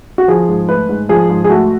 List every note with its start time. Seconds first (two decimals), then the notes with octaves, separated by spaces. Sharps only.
0.18 F#4
0.28 F3 G#4
0.48 G#2
0.69 A3 B4
0.89 G#2
1.09 F3 G#4
1.29 G#2
1.44 G#4
1.50 A3 F#4